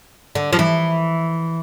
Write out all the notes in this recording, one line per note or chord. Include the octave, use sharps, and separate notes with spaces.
D3
F3
E3